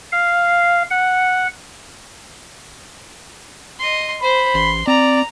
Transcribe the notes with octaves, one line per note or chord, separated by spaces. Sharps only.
F5
F#5
D#5 C6
C5 B5
A1 C6
C4 D5 A#5